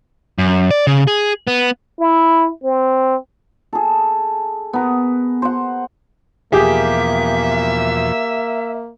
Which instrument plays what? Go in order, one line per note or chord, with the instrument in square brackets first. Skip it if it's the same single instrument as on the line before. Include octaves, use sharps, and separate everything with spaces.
[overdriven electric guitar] F#2
D5
C#3
G#4
B3
[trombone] E4
C4
[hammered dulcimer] G#4 A4
B3 A#4
C5 F#5
[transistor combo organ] E2 B2 F3 [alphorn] A#3 [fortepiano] G4 G#4 [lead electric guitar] E5